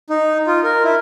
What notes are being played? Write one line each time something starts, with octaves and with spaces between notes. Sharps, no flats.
D#4
F4
A#4
E4